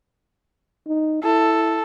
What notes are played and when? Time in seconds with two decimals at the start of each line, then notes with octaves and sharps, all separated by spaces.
0.87 D#4
1.24 E4 A4